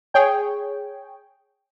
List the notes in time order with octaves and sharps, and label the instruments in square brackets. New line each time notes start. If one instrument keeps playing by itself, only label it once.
[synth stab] G#4 C#5 G5